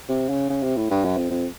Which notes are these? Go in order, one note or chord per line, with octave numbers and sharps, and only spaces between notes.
C3
C#3
C#3
C3
A2
G2
F#2
F2
F2